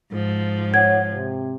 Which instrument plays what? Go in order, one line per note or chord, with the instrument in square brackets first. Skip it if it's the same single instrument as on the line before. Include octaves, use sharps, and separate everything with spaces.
[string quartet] G#2 F3
[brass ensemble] C#5 F#5 [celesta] G#6
[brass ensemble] C3